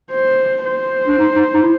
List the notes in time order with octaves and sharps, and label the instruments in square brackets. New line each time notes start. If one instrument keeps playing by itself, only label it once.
[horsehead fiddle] C5
C5
[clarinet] D4
D#4
D#4
D#4
E4